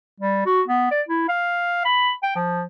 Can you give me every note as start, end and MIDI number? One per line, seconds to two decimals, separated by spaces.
0.20 0.46 55
0.46 0.62 66
0.68 0.89 59
0.91 1.01 74
1.08 1.25 64
1.29 1.85 77
1.85 2.11 83
2.23 2.34 79
2.36 2.63 53